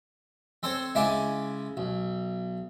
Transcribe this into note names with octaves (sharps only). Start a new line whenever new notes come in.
C4 A4 C5 C#5
C#3 G#3 E4 G#5 A5 D6
B1